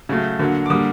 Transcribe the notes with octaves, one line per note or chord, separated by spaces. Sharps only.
C#3 F#3 A3
D3 F#3 A#3
D6
D3 G3 A#3 D#6